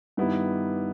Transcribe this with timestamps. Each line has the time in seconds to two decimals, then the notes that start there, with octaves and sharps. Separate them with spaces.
0.17 G2 D#3 G3 B3 E4